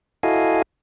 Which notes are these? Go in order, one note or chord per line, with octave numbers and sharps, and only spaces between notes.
E4 F#4 A4 D#5 F5 G#5